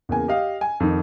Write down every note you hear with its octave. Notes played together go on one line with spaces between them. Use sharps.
E2 C#3 A#3 G#5
G4 D#5 F5
G#5
F2 D#3